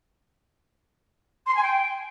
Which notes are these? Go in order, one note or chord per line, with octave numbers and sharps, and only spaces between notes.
C6
G#5
G5